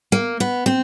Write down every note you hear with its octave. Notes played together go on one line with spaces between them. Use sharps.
A#3
B3
C4